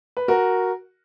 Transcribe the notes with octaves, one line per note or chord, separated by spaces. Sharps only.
B4
F#4 A#4